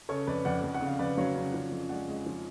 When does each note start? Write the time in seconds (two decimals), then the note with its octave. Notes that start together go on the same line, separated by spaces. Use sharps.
0.09 C#3 A4 C#5
0.27 F2 B4 D5
0.45 F2 D5 F#5
0.63 F2
0.74 F#5
0.81 C#3
0.87 F5
0.99 F2 B4 D5
1.17 F#3 C#5 F5
1.36 C#3
1.53 F3
1.72 F2
1.89 G#3 D5 F#5
2.08 G#3
2.26 F3